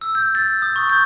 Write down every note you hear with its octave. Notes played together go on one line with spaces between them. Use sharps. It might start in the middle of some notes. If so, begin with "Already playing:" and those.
E6
G6
A6
D#6
C#6
G6